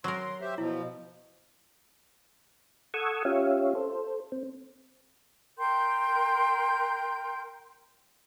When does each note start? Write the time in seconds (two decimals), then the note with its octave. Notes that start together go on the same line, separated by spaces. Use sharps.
0.04 F#3 A#4 C6
0.41 G4 C5 E5
0.58 B2 F3 E4
2.94 A4 F#5 C#6 D#6 E6 G#6
3.25 C#4 F4 G4 C#5 E5 F5
3.75 A4 C5
4.32 C4
5.58 A#4 G5 C6 G6